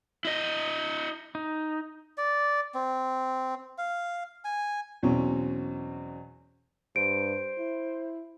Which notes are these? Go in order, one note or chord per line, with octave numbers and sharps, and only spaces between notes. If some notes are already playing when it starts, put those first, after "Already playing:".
E4 D#5
D#4
D5
C4
F5
G#5
E2 B2 F#3 C4 C#4
G2 C5 D7
E4